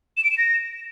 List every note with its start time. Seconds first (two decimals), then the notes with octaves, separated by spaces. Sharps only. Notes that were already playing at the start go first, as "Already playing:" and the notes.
0.17 E7
0.24 D7
0.31 E7
0.38 A#6